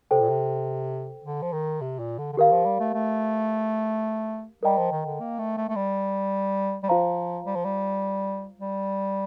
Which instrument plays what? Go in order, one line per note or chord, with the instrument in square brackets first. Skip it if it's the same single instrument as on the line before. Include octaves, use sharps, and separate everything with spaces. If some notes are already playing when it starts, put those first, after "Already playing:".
[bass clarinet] C3 [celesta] A4 C5 G5
[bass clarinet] A#2
C3
D3
F3
D#3
C3
A#2
D3
D3
[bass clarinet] D#3 [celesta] G4 A#4 F5
[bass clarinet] F3
G3
A3
A3
[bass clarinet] G3 [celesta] A#4 D#5 G5 A#5
[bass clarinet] F3
D#3
D3
A#3
A3
A3
A3
G3
G3
[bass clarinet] F3 [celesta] F4 C5 F5 A#5
[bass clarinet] G3
F3
G3
G3